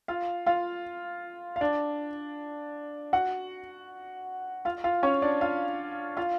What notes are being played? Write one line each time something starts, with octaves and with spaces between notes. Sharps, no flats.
F4 F5
F4 F5
F5
D4 D5
F#4 F#5
F4 F5
F4 F5
C#4 C#5
D4 D5
F4 F5
F4 F5